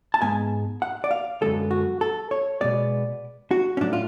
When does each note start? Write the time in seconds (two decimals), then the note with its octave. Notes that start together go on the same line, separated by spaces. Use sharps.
0.14 A5
0.22 G#2 G#3 B3 G#5
0.82 F#5
1.04 D5
1.11 F5
1.41 F#2 D3 G#3 B3 A4
1.71 F#4
2.01 A4
2.31 C#5
2.61 B2 G#3 B3 D5
3.51 F#4
3.77 C#4
3.81 A2 F#3 A3 D4
3.93 F4